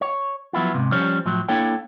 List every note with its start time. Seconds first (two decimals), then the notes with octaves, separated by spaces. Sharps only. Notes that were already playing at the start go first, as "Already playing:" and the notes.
0.01 C#5
0.53 F3 F#3 B3 E4 F4
0.74 G#2 C3
0.92 F3 G3 C#4 C5 C#5
1.26 A2 F3 F#3
1.49 A#3 D4 E4 A4 C#5 G5